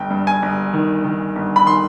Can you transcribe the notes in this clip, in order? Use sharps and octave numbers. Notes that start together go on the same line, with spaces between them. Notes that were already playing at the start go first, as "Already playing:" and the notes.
Already playing: G1 G5
G2
G#5
G1
D#3
D#3
G1
B5
D#3 C6